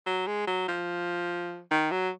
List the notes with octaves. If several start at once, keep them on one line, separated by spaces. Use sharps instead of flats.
F#3
G#3
F#3
F3
D#3
F#3